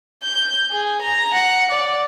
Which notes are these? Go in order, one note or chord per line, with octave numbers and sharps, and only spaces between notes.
G6
G#4
A#5
F#5
D5